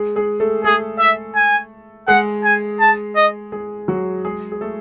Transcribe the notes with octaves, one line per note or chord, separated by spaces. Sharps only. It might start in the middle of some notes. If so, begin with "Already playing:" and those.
Already playing: G#3 G#4
G#3 G#4
A3 A4
A3 G#4 A4
E5
G#5
G#3 G#4 F#5
G#5
A5
D#5
G#3 G#4
F#3 F#4
G#3 G#4
G#4
A3 A4